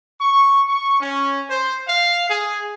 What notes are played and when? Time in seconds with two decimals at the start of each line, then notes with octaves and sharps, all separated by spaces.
0.20 C#6
0.68 C#6
1.01 C#4
1.50 C5
1.87 F5
2.30 G#4